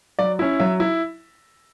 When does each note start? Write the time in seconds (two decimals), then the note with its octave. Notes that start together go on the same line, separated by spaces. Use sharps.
0.19 F#3 D5
0.39 C#4 E4
0.60 F#3 E5
0.80 E4